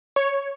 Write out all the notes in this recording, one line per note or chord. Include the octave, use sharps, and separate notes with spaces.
C#5